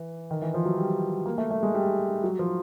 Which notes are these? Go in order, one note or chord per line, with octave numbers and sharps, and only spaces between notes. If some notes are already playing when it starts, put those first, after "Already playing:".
Already playing: E3
D#3
E3
F3
F#3
G3
A#3
A3
A3
G#3
G3
F#3
F3